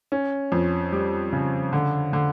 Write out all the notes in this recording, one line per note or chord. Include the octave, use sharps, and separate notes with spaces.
C#4
F2
G3
C#3
D3
D3